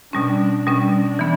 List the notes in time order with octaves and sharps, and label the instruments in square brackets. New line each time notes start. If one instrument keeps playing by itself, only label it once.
[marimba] B2 G3 C#4 [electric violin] D4
[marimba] B2 G3 C#4 [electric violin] D4
[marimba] E3 B3